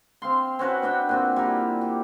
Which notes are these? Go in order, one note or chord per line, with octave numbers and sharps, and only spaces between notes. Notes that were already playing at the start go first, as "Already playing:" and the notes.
C4 F5 C6
C4 C#4 F#4 B4
B3 D4 E5 G5
A#2 C4 F#4
G3 E4 A#4 G#5
G4